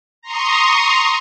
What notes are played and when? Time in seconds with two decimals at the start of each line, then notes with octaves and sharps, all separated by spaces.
0.22 A#5 C6 C#6 D#6